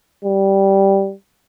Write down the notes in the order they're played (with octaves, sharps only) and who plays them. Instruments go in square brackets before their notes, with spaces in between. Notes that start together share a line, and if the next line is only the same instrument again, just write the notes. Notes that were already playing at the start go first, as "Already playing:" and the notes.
[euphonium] G3